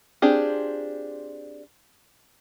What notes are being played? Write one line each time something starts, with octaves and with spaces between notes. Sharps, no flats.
C4 D4 F4 G4 G#4